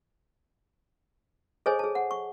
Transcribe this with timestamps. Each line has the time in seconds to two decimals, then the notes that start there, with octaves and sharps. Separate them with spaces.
1.66 G#4 A4 C5 C#5 D#5 G#5
1.79 G#4 A5
1.95 F#5
2.11 C#6